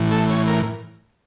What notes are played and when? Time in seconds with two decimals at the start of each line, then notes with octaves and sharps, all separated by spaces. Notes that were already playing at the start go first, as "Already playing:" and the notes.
Already playing: A2 E3
0.12 A4
0.30 C#5
0.48 A#4